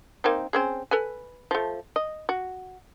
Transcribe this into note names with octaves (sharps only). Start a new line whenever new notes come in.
A#3 C4 D#4
C4 C#4 G#4
A4 B4 G#5
F3 A3
D#5
F#4